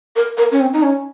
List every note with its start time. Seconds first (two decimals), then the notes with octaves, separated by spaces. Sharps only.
0.16 A#4
0.37 A#4
0.51 C#4
0.60 C4
0.73 D#4
0.83 C#4